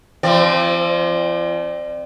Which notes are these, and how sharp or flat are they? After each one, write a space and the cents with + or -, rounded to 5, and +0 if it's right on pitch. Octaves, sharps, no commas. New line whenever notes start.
F3 -40 C4 +0 D5 +25